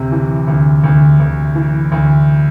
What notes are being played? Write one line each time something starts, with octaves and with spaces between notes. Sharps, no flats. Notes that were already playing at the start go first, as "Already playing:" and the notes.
Already playing: D2 C3
E3
D2
D2
D2
E3
D2